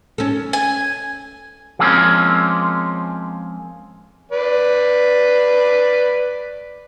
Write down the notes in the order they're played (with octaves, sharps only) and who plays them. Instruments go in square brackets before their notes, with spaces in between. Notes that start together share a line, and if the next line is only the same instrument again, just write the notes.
[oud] C#4 A4
[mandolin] G#5
[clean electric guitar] F3 G#3 A#3 C4 C#4
[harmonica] B4 D5